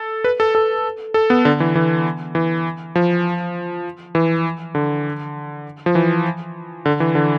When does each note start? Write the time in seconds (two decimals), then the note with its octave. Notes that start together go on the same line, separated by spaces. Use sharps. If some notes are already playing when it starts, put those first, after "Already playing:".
Already playing: A4
0.24 B4
0.40 A4
0.55 A4
1.14 A4
1.30 B3
1.45 D3
1.60 E3
1.75 E3
2.35 E3
2.95 F3
4.15 E3
4.75 D3
5.86 F3
5.95 E3
6.86 D3
7.00 E3
7.15 D3